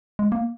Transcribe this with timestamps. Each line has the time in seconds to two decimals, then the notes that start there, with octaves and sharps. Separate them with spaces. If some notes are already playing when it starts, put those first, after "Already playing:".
0.19 G#3
0.32 A#3